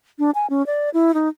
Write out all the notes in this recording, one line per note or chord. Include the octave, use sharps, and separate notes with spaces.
D4
G#5
C#4
D5
E4
D#4